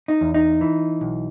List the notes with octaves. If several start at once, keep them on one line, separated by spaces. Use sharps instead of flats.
D#4
E2
D#4
E3
B1